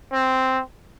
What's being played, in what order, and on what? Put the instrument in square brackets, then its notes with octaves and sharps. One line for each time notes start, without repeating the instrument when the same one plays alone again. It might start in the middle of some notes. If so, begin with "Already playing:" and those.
[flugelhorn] C4